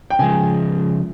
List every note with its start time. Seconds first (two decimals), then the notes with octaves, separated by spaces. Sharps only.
0.10 G5
0.19 C#3 F3 G#3 G#5